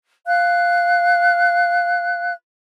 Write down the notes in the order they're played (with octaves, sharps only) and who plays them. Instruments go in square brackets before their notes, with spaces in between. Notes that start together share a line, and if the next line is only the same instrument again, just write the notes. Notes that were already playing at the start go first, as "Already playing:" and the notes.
[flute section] F5 F#6